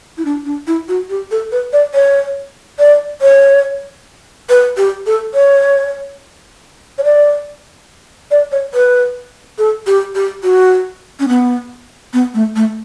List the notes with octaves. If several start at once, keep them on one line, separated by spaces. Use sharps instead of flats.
E4
D4
D4
E4
F#4
G4
A4
B4
D5
C#5
D5
C#5
B4
G4
A4
C#5
C#5
D5
D5
C#5
B4
A4
G4
G4
F#4
C#4
B3
B3
A3
A3